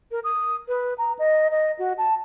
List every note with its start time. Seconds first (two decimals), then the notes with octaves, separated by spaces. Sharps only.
0.11 A#4
0.24 D#6
0.68 B4
0.98 A#5
1.19 D#5
1.51 D#5
1.79 F#4
1.98 A5